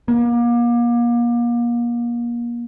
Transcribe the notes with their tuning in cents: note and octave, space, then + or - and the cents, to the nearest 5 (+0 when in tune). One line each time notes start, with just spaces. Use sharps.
A#3 +35